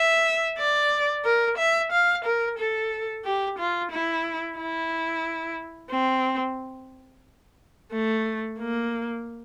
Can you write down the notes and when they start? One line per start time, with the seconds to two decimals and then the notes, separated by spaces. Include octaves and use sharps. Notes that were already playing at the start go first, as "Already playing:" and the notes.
Already playing: E5
0.58 D5
1.25 A#4
1.58 E5
1.92 F5
2.25 A#4
2.58 A4
3.24 G4
3.59 F4
3.92 E4
4.58 E4
5.91 C4
7.92 A3
8.58 A#3